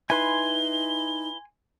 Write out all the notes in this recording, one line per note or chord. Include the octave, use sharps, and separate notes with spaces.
D#4 E4 B4 G#5 C6 G7